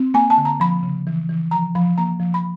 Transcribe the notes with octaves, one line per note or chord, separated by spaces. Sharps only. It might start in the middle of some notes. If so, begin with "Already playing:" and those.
Already playing: C4
A#3 G#5
A5
D3
A#5
F3 B5
C#3
E3
E3
F3 A#5
F3 B5
A#3 A#5
F3
B5